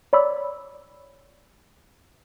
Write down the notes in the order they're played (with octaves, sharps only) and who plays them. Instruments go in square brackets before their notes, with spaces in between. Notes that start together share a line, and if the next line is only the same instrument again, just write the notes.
[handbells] C#5 D5 B5 D6 E6